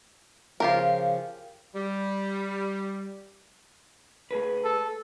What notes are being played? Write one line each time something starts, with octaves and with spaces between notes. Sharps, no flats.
C#3 F3 F4 G4 A#4
G3
A3 G#4 B4
A4